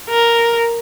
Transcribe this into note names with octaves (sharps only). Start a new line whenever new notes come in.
A#4